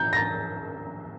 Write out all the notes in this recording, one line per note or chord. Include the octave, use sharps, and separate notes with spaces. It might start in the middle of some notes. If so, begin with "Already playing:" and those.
Already playing: G6
A#6
A6